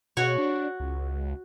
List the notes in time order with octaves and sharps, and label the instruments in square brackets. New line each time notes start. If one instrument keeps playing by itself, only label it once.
[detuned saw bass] B2 [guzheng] F#4 C#5
[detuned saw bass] D4
C#2